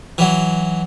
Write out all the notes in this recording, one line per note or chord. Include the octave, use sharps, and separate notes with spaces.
E3 F#3